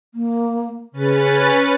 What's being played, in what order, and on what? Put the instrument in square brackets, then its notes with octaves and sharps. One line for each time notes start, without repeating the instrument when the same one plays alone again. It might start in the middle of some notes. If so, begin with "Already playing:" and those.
[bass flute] A#3
[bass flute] C#3 [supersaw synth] C#4 B4 A6